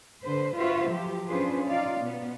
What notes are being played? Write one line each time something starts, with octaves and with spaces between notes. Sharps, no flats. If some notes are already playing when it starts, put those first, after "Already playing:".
D3 B4 C5
F4 F#4 B4 C5 E5
F3 F#3 G4
C#4 D4 F4 G#4 B4 C5
D#4 F4 D5 F5
B2 B3